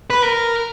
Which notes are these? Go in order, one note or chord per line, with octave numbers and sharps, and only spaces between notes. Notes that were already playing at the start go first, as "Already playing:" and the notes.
B4
A#4